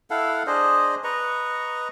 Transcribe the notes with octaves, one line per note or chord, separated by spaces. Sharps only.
E4 A4 F5 F#5
D4 G#4 C5 D#5
B4 D#5 A#5 C#6